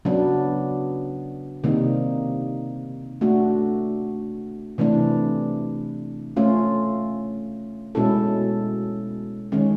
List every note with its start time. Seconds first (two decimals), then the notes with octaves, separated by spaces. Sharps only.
0.05 C#3 F#3 B3 D4
1.64 C3 D#3 G3 A#3 D#4
3.21 A3 D4 F#4
4.78 C3 E3 A3 D4
6.36 A3 C#4 F4
7.95 B2 G#3 C#4 E4 A4
9.52 D#3 G#3 C#4